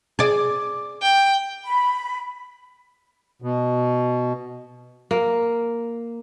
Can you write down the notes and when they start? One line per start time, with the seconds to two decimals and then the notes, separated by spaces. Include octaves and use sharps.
0.19 G#4 D5
1.02 G5
1.66 B5
3.42 B2
5.11 A#3